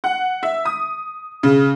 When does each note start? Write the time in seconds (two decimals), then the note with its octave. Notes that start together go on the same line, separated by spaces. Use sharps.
0.04 F#5
0.43 E5
0.65 D#6
1.43 C#3